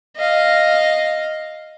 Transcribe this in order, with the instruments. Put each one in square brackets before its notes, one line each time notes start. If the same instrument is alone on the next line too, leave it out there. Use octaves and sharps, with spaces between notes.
[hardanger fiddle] D#5 F5